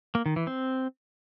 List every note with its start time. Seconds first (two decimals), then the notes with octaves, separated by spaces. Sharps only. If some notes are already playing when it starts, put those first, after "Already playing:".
0.15 A#3
0.26 D#3
0.36 E3
0.47 C4